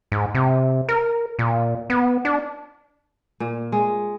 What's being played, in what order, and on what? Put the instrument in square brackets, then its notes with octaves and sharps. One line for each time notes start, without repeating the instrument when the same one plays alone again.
[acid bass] G#2
C3
A#4
A#2
B3
D4
[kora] A#2
G#3